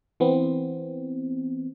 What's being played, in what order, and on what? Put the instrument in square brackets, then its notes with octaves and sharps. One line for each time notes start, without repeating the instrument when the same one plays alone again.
[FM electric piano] E3 B3 C4